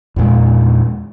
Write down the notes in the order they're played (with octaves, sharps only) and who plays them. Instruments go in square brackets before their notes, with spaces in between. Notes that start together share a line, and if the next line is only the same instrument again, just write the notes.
[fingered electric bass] E2 A#2 G#3